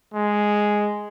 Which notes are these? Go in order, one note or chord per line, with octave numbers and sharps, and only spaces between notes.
G#3